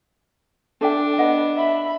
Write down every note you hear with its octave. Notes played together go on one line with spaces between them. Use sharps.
D4 A4 E5 G5
B3 D#5 F#5
E5 B5